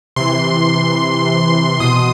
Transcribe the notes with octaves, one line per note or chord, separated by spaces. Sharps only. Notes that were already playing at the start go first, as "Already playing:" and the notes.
C3 E3 C6
B2 D#6